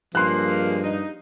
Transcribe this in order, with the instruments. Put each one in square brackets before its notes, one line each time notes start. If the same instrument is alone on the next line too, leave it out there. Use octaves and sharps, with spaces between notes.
[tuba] G2 [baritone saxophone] F3 [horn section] G#3 A#3 [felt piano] C6 F#6
[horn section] D#4